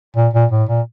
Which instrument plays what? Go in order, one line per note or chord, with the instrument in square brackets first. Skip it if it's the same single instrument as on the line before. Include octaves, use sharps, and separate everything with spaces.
[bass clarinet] A#2
A#2
A2
A#2